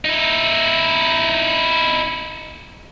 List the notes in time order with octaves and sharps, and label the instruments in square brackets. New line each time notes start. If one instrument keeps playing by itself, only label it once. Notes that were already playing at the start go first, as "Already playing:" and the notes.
[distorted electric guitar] D#4 E4